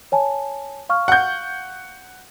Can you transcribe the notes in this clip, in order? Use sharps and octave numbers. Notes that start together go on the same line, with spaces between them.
C#5 G#5 A5
F5 C#6 F6
F#5 G6